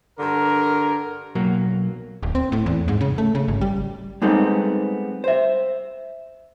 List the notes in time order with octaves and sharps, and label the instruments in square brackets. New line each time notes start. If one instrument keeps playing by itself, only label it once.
[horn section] G2 D3 A#4
[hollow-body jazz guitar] B1 F#3 A#3
[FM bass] D1
C4
A2
E2
G#2
C#3
A3
C#3
G#1
G3
[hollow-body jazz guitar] G3 G#3 B3 C4 D#4 A4
C5 E5